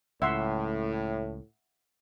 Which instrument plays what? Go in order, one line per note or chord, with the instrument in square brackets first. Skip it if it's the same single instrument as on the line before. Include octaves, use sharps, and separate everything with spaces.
[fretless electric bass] C#2 [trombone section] A2 [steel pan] E5 F#5 C6